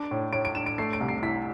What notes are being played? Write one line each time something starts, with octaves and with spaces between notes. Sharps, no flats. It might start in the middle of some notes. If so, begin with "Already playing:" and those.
Already playing: D4 D7
A2
A2 D7
D7
D4 E7
D7
A3 C7
D7
C2
C7
E4 B6